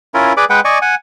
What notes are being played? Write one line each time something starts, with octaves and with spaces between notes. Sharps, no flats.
C#4 E4 F4 A#4
G#4 B4 D5 B5 D6
G#3 B4 F#5 G5
D5 D#5 G#5 C#6
F#5 G#5